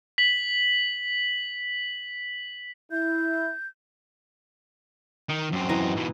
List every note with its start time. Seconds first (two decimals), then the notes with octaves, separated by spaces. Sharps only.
0.18 B6 F#7
2.92 E4 G6
5.29 D#3
5.52 F#2 C4
5.69 E3 D#5 A#5
5.96 G#2 B2